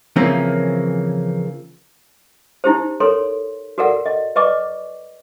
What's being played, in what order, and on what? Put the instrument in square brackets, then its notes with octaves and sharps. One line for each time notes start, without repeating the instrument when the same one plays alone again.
[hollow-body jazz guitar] C#3 E3 F3 A#3 C4 C#4
[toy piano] D#4 E4 G4 C5
A4 A#4 C#5 C6
F#4 A4 A#4 D5 F#5
D#5
B4 D5 D#5 C#6 D6